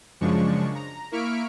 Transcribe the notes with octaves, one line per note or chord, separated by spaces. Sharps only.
F#2 C#3 F3 G#3 D4 C#6
A#5
A#3 E4 C#6 F6 B6 D7